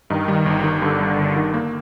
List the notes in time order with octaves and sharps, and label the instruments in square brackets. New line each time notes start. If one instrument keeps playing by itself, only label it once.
[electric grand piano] G2 [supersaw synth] D#3
[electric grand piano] G3
G1
D#3
[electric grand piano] G2 [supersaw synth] D3
[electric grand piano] G3
G1
D#3
A#3